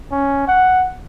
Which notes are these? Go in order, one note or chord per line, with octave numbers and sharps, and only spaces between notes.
C#4
F#5